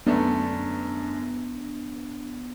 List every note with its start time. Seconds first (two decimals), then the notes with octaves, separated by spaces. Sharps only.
0.06 F#2 D3 A3 B3 D4